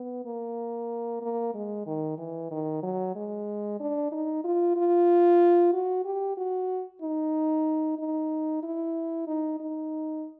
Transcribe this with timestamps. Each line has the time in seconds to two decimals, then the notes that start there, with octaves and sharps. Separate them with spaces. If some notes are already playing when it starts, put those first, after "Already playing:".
Already playing: B3
0.25 A#3
1.21 A#3
1.54 G#3
1.86 D#3
2.18 E3
2.51 D#3
2.83 F#3
3.15 G#3
3.80 D4
4.12 D#4
4.44 F4
4.76 F4
5.73 F#4
6.05 G4
6.37 F#4
7.02 D#4
7.99 D#4
8.63 E4
9.27 D#4
9.60 D#4